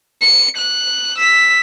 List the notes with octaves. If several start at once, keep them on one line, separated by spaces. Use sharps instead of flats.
C#7
F#6
E6 B6